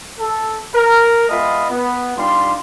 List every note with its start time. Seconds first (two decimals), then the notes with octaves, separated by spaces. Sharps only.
0.19 A4
0.74 A#4
1.29 G#3 B3 F4 D#5 E5 B5
1.70 B3
2.17 G3 D4 D#4 F4 C6